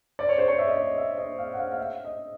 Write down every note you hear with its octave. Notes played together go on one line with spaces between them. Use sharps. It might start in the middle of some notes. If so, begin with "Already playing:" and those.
D5
C#5
C5
C#5
E5
D#5
D5
D#5
E5
D#5
F5
F#5
F5
F5
E5
D#5